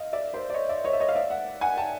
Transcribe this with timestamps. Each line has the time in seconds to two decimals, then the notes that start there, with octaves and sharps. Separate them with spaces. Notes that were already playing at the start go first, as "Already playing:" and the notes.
Already playing: D#5 F5
0.13 D5 E5
0.34 C5 D5
0.50 D5
0.54 C#5 D#5
0.69 D5 E5
0.84 C#5 D#5
0.93 E5
1.00 C#5 D#5
1.08 F5
1.15 D5 E5
1.30 E5 F#5
1.61 F#5 G#5
1.77 G5 A5